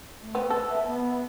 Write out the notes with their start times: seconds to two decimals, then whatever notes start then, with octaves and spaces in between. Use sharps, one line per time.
0.22 A3
0.35 B3 C4
0.50 A4 B4
0.69 E5
0.86 B3